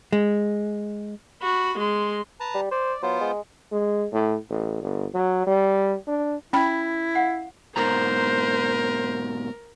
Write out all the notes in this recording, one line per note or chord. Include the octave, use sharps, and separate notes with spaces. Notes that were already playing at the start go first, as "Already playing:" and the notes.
G#3
F#4 B5
G#3 C6
B4 A5 A#5
G3
C5 D5
F#3 B3 F4 C5
G#3
G#3
A2
A1
G1
F#3
G3
D4
C#4 E4 G5 B5
F5 F#5
G#2 B2 A#4 C5 A#5